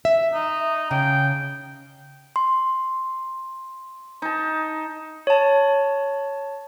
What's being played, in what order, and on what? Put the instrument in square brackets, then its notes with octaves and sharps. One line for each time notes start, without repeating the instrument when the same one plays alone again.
[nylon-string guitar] E5
[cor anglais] D#4
[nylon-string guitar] C#3 [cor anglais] G5
[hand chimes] C6
[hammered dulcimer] D#4 A5
[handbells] C#5 A5